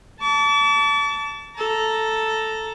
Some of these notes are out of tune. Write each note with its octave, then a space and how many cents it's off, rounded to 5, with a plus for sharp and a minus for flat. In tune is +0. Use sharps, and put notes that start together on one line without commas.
A5 +0 D6 -45
A4 +0 A#5 +0